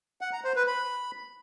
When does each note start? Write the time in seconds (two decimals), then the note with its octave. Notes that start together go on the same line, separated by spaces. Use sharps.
0.21 F#5
0.33 A#5
0.44 C5
0.56 B4
0.67 B5